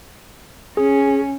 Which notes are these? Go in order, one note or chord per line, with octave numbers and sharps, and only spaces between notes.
C#4 G#4